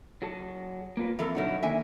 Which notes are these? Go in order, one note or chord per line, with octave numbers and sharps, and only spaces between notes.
F#3 G#4 A5
A#3 F4 B4
F2 E3 A4 A#4
B2 D3 F#3 D#4 E4 F#4
D3 D#3 A#3 E5 G#5